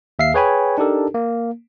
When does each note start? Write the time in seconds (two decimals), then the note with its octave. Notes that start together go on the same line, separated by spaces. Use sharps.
0.19 D#2 E5 F5 C7
0.34 G#4 B4 C#5 G5 G#5 B5
0.78 D4 D#4 G4 A4 A#4
1.14 A#3